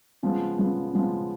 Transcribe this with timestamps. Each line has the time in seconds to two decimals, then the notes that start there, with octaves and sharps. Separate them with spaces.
0.23 C#3 F3 G#3 B3
0.57 C#3 F3 G#3 B3
0.93 C#3 F3 G#3 B3